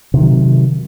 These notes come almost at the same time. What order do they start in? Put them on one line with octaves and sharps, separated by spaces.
C3 D#3 F#3